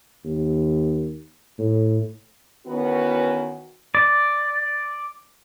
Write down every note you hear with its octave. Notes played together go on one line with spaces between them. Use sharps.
D#2
A2
D#3 E3 B3 C#4 F#4
D5